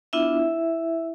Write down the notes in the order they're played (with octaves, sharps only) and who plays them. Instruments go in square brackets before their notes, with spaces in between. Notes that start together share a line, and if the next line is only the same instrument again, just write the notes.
[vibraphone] B3 D4 E4 F4 E5